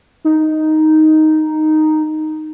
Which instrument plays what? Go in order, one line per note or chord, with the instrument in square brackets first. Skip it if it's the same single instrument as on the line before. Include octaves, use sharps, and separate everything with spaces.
[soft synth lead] D#4